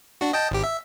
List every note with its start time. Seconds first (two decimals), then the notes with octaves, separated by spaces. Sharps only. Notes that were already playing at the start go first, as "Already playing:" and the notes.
0.21 D4 F#4
0.33 D#5 G5 A5
0.51 G#1 G4
0.64 E5